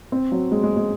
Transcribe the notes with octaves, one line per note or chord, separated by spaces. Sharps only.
C4
F#3
G#3
G#3
G#3